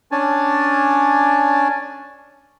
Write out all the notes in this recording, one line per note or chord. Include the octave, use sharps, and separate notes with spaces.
C#4 D4 C#5 D5 G#5 A5